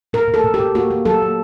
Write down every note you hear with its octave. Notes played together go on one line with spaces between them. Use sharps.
A#2 A#4
A#2
A4
A#2
G4
A#2
A#3 F#4
A#3
F#3 A4
A#3